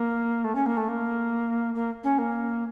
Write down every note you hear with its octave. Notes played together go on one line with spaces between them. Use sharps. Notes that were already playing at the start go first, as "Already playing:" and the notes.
Already playing: A#3
A3
C#4
A#3
A3
A#3
A#3
C#4
A#3